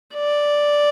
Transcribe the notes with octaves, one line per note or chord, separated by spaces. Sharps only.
D5